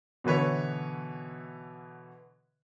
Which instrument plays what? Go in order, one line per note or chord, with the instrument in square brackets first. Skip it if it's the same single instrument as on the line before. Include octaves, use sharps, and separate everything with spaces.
[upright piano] B2 D3 E3 B4 C#5